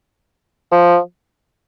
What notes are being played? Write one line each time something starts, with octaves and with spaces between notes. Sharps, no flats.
F3